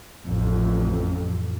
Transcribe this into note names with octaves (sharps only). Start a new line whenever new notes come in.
A1 F2